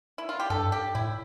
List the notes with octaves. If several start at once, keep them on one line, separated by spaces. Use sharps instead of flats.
E4
F4
G4
G2 A4
G4
A2 E4